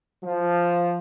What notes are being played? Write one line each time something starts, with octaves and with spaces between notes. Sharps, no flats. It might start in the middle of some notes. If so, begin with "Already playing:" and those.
F3